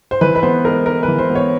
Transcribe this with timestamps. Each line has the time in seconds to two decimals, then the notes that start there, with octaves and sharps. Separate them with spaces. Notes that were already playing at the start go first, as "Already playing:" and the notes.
0.11 C5
0.21 E3 B4
0.36 B4
0.43 B3 C5
0.65 G#3 A#4
0.86 G#3 A#4
1.03 B4
1.08 E3
1.19 C5
1.29 B3
1.35 C#5